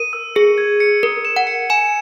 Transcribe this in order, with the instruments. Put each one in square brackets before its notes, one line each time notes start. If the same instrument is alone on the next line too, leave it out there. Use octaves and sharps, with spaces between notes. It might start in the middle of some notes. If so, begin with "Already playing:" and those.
Already playing: [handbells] A#4 [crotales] D#7
[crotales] E6
[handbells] G#4 [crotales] C#7
[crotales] G#6
C#7
[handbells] A#4 [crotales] C#7
[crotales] E7
[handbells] F#5
[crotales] C#7
[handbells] G#5 [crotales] E7